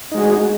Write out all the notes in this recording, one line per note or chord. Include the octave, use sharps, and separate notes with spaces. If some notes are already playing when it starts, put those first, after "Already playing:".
G#3 D#4 F#4 G#4